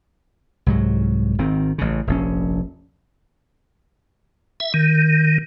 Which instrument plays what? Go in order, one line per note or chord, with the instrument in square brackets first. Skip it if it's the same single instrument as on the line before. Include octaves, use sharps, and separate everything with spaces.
[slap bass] C2 G#2 F#3
G#1 D#3 C4
A1 C#3
F1 A#1 C#4
[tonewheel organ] E5
D#3